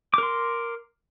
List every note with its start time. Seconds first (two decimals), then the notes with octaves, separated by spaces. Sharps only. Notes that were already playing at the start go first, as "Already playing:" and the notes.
0.14 D6
0.18 A#4
0.23 C6